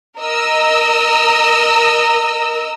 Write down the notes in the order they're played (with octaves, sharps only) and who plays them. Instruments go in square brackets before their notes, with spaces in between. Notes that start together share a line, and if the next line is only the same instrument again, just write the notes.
[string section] A#4 D#5 E6